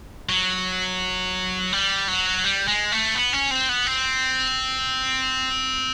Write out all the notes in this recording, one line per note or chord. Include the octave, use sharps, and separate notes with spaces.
F#3
G3
F#3
G3
G#3
A3
B3
C#4
C4
B3
C4